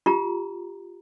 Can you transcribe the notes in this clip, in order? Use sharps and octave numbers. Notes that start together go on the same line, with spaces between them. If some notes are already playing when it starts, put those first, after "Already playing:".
F4 G4 A#5